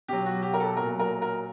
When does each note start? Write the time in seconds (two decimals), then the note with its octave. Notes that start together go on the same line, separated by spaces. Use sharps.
0.08 B2 F#3 G4
0.26 F#4
0.42 G4
0.54 A#4
0.60 A4
0.77 A#2 F#3 A#4
0.99 A#4
1.22 A#4